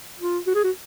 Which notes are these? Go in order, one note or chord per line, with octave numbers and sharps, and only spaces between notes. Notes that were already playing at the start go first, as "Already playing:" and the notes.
F4
F#4
G#4
F#4